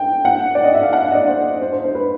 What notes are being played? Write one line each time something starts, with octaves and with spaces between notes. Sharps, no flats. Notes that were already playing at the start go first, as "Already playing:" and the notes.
Already playing: G5
F#5
D5
D#5
E5
F5
F#5
F#5
D#5
D5
C5
C5
C5
C5
B4